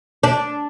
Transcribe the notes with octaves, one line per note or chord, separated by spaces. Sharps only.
D4